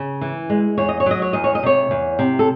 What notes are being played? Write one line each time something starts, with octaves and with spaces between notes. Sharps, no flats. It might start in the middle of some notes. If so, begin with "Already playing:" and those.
Already playing: C#3
E3
G#3
E2 C#5
D#5
C#5
F#3 D#5
C#5
E2 D#5
C#5
D#5
C3 C#5
E2
C3
A4